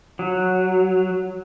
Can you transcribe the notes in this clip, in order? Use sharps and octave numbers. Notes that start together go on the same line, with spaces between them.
F#3